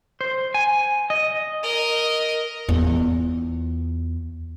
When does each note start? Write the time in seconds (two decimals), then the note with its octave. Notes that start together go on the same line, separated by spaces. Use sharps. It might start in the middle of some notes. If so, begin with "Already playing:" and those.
0.21 C5
0.54 G#5
1.10 D#5
1.63 A#4 D#5
2.69 E2 F4